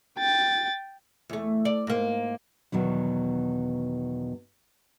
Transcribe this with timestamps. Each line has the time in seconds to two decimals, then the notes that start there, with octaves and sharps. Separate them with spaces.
0.18 G5 A6
1.29 E2 A3
1.65 D5
1.87 G#2 A#3
2.72 E2 B2 D#3 F#3